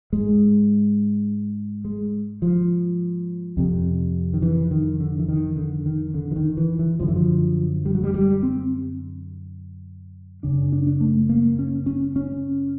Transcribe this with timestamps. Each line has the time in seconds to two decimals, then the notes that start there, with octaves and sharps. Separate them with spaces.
0.13 G#2 G#3
1.85 G#3
2.42 F3
3.57 F2 C3
4.34 D#3
4.42 E3
4.71 D#3
5.00 D3
5.19 E3
5.28 D#3
5.57 D3
5.86 D#3
6.14 D3
6.31 E3
6.36 D#3
6.57 E3
6.79 E3
7.00 F#2 D3 F3
7.08 E3
7.16 F3
7.85 G3
7.95 F#3
8.03 G3
8.14 G3
8.43 C4
10.43 F#2 C#3 D4
10.72 D4
10.87 D4
11.01 A3
11.29 A#3
11.59 C#4
11.86 C#4
12.16 C#4